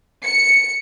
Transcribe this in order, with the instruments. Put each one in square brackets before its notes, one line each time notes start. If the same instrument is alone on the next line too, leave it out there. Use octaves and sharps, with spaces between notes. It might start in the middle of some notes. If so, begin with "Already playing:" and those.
[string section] C#7